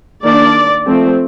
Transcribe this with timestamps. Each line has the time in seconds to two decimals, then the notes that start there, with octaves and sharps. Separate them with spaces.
0.24 D#3 A#3 D4 D5
0.87 F3 A3 C4